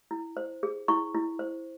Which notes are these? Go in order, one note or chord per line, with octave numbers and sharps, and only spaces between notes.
E4
C5
G#4
E4 C#6
E4
C5